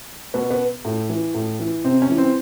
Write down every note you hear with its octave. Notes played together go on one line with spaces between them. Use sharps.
B2 B3
B3
A2
E3
A2
E3
C3 C4
C#4
E3
C4